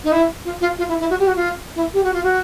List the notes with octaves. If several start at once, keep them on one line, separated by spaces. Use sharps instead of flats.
D#4
E4
F4
F4
F4
E4
E4
F#4
G4
F#4
F4
E4
G4
F#4
F4
F#4